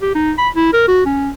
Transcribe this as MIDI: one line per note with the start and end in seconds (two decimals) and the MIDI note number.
0.02 0.11 67
0.15 0.32 63
0.38 0.49 83
0.56 0.69 64
0.73 0.84 70
0.88 1.04 66
1.05 1.30 61